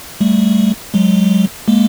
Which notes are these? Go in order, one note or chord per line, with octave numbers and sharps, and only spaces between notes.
G3 A3
F#3 G#3
G#3 A#3